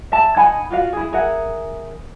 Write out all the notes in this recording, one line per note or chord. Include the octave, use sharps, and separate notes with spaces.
E5 A5
D#4 F#5 G#5 B5
F4 F#4 F5
E4 G#4
G#4 A#4 E5 F#5